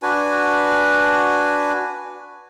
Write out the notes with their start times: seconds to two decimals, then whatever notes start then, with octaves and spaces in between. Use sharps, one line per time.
0.02 D4 F#4 B4 G#5